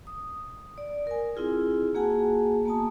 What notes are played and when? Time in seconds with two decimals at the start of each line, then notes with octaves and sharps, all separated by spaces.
0.07 D#6
0.78 D5
1.07 A#4 G#5
1.36 C4 E4 F4 G#4
1.94 A#3 F#4 G#4 F#5 G#5 A5
2.65 A#3 B3 A5 D#6